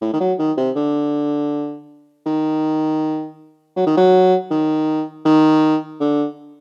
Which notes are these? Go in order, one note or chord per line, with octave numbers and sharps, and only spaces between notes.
A2
D#3
F#3
D#3
C3
D3
D#3
F#3
D#3
F#3
D#3
D#3
D3